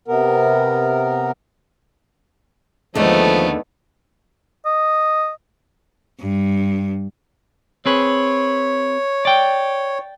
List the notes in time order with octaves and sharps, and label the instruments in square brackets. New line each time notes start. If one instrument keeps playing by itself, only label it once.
[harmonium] C3 B3 A#4
[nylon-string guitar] D#2 D3 G#3 [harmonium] F3 [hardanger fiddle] A3 B3 [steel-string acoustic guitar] D#4 C#5
[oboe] D#5
[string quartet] G2
[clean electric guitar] C4 G#4 B4 [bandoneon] C#5
[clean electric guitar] D5 G5